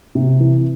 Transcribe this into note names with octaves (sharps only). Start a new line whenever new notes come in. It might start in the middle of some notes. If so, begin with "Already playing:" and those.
C3
E3